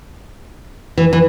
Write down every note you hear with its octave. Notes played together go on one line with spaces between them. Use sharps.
E3
E3